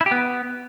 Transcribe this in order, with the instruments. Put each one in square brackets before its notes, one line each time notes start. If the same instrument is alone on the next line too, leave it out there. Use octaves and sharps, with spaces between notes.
[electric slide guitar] E4
G4
B3